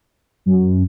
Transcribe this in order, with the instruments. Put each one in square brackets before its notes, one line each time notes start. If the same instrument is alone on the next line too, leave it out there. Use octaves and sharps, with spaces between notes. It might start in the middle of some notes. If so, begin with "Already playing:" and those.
[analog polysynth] F#2